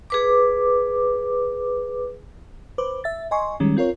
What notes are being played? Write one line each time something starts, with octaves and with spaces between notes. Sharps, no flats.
G#4 B4 D6
B4 C5 D6
E5 A6
D#5 G#5 C6 C#6
D#3 G3 G#3 C#4
C4 F4 A#4 C#5